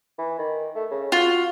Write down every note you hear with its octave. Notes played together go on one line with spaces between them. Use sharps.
E3
D#3
A3
C#3
F4 F#4